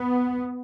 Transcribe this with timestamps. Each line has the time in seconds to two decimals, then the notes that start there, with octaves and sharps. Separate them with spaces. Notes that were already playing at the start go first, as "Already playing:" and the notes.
Already playing: B3